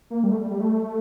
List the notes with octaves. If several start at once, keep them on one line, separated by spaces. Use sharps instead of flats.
A#3
G3
A3
G3
G3
A3